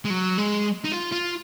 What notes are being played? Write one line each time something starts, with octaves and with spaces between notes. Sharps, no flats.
G#3
F#3
G#3
D#4
F4
F4